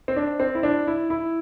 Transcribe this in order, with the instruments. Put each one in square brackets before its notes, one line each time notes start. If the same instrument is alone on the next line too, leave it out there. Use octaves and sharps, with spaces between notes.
[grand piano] C4
D4
C4
E4
D4
E4
E4